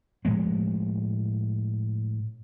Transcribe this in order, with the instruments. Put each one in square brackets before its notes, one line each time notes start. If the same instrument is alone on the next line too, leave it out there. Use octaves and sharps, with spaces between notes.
[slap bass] A2 F3 G#3 B3